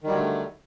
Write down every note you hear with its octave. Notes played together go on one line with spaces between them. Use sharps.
D3 D#3 F#3 G3 A3